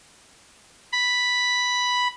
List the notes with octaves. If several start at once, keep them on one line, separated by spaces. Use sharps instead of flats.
B5